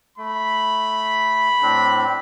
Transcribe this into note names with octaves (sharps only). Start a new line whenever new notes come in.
A3 B5
A2 C4 D4